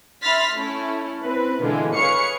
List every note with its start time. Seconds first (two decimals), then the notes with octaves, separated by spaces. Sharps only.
0.22 E5 B5 C6 F6 A6 B6
0.55 A3 C#4 E4
1.23 C4 E4 B4
1.62 B2 D3 E3 G#3 F4
1.95 G#4 B4 C#5 F5 C#6 C#7